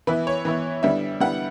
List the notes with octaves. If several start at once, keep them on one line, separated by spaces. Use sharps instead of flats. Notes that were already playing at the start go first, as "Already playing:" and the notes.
E3 B3 E4 B4
C#5
E3 B3 E4
D3 G3 B3 E4 E5
D3 G3 B3 E4 F#5